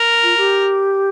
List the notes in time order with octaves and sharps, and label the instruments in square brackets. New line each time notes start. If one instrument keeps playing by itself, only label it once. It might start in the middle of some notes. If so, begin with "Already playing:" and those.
Already playing: [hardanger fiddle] A#4
[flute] F4
G4